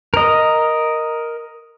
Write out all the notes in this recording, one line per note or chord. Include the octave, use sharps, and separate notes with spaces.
A#4 D#5